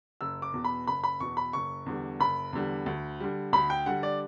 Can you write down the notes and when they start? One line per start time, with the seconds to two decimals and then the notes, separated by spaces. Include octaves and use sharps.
0.21 F#1 E6
0.42 D6
0.54 E2 B2
0.64 B5
0.87 F#1 B5
1.04 B5
1.20 E2 B2 C#6
1.37 B5
1.53 F#1 C#6
1.86 E2 D3 G3
2.20 F#1 B5
2.53 E2 D3 G3
2.86 D2
3.20 D3 G3
3.53 D2 B5
3.70 G5
3.86 D3 G3 F#5
4.03 D5